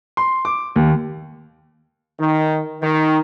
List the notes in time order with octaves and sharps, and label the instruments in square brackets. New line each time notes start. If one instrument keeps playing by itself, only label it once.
[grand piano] C6
D6
D#2
[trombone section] D#3
D#3